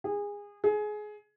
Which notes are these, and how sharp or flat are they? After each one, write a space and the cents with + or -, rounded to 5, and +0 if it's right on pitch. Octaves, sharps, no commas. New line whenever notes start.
G#4 -25
G#4 +20